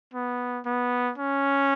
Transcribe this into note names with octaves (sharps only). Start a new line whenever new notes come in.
B3
B3
C#4